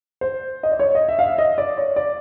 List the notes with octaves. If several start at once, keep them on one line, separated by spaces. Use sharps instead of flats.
C5
D#5
D5
C#5
D#5
E5
F5
E5
D#5
D5
C#5
D5